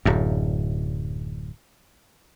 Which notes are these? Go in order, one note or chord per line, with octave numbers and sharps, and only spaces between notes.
D1 F#2